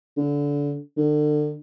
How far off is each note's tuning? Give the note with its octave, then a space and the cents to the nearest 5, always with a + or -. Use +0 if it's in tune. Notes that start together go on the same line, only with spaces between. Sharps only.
D3 -25
D3 +30